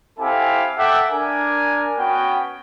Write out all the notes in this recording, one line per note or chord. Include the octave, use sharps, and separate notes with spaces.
C4 E4 G4 A4 F5 G#5
A4 E5 F#5 G5 D6
D4 A#4 G#5
B3 C#4 F#4 B4 G5